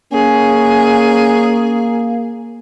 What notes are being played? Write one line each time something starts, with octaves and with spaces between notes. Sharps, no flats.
A#3 C#4 G#4